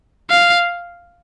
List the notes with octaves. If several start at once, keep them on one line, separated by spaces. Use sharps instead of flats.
F5